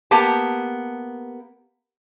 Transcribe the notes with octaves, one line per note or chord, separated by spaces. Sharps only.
A#3 B3 G4 A5